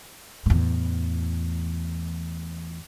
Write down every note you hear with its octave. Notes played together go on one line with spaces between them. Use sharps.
E2 A2